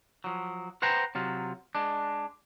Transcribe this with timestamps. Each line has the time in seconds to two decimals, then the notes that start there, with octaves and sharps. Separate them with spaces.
0.24 F3 F#3
0.82 B4 C5 F#5 G5 A#5
1.15 C3 F#3 F4
1.75 G#3 D4